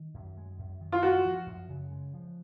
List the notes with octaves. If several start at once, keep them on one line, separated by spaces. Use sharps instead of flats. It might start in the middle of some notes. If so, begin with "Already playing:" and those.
Already playing: D#3
F#2
G#3
F#2
D#3
F4
G#3 F#4
F3
F#2
C#3
G#3
F3